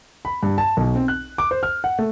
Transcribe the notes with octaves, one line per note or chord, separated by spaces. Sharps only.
B5
G2
A5
B1
C4
F#6
D6
C5
F6
F#5
A3